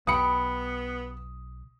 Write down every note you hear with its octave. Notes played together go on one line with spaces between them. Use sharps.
B1 B3 G4 B5 D#6 C#7